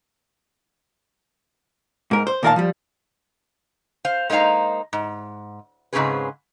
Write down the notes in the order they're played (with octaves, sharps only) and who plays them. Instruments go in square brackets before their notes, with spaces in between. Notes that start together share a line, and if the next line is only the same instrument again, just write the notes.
[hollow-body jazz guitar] G#2 A#4
C5
A#2 D#3 A#4 D5 F5 A5
F3 G3
[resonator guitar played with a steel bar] C5 F5
G#3 A#3 D#4 C5 F5 A#5
G#2
G#2 C#3 C4 C#4 G#4 B4